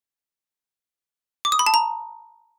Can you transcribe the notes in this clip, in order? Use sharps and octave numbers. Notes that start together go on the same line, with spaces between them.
D6
D#6
B5
A5
A#5